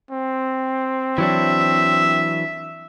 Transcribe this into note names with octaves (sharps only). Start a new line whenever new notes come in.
C4
E3 F#3 D4 E5